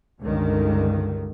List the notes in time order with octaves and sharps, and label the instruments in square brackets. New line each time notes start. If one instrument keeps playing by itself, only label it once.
[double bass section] C#2 G2 D3 D#3